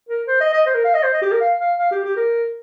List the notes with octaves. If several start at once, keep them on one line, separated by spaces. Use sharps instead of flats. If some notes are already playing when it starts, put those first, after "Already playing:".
A#4
C5
D#5
D#5
C5
A#4
F5
D#5
C5
D#5
G4
A#4
F5
F5
F5
G4
G4
A#4